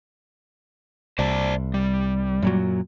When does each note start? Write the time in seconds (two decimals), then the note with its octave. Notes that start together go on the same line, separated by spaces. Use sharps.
1.19 C2 C5 D5 A5
1.74 G3
2.42 F#2 A#2 F#3